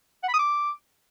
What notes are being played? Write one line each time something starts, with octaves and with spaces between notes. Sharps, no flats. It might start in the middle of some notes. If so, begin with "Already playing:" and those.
F#5
B5
D#6
D6